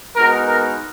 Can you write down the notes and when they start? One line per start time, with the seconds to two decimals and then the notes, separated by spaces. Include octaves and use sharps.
0.15 G#3 B3 D#4 F#4 A#4
0.46 A#4